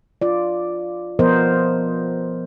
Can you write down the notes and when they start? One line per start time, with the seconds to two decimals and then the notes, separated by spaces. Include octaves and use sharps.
0.21 F4 D5
1.19 F3 B3 A#4 C5 D#5